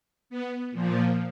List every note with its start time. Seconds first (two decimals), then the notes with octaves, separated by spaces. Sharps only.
0.30 B3
0.72 A#2 F3